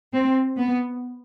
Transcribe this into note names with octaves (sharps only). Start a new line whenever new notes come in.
C4
B3